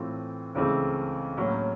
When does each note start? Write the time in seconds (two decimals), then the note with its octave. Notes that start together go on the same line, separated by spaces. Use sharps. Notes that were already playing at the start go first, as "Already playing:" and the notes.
Already playing: A2 E3 A3 C4 F4
0.55 C#2 C#3 E3 A3 C4
1.37 A2 F#3 A#3 C#4